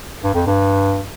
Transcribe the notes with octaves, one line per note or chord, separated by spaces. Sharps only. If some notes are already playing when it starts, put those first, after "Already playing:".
G2
F2
G2